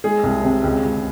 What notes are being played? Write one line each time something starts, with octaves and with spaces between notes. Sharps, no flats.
G#3 G#4
C2
C3
C#2
C#2